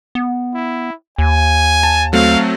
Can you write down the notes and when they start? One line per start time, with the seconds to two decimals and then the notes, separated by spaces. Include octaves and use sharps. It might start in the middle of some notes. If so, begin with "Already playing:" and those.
0.15 B3
0.54 E4
1.18 D#2 G#5
1.83 A5
2.13 F#3 A3 C4 F5